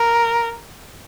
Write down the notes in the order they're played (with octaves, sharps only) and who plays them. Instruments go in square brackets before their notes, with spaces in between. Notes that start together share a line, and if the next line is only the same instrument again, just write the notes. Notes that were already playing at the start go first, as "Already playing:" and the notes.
Already playing: [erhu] A#4